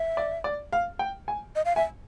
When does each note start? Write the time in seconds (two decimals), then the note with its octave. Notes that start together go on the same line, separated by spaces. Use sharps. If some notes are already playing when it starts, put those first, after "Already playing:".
Already playing: E5
0.17 D5
0.44 D5
0.73 F5
0.99 G5
1.28 G#5
1.56 D#5
1.65 F5
1.76 E5 G#5